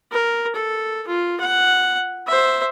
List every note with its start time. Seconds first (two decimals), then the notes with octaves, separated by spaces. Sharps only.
0.12 A#4
0.55 A4
1.08 F4
1.40 F#5
2.27 C5 E5